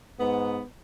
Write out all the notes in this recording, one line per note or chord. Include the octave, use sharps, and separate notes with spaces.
G#2 B3